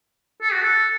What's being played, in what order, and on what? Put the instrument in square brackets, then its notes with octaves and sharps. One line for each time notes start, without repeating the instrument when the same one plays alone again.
[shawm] A4
F#4
A4